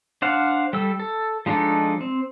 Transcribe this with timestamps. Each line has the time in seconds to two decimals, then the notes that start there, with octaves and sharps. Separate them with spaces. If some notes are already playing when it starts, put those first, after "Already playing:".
0.22 D4 C5 F5 F#5
0.73 G3 A4 E6
1.00 A4
1.46 F3 G#3 D4 D#4 A4
2.01 C4